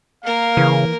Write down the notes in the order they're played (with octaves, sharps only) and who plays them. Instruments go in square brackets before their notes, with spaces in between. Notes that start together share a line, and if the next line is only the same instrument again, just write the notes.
[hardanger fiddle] A#3 A#4 [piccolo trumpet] F5
[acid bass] C#3 [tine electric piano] E3